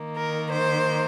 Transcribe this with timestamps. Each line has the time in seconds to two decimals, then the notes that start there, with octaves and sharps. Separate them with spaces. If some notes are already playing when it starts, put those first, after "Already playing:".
Already playing: D#3 A#3
0.15 A#4
0.51 C5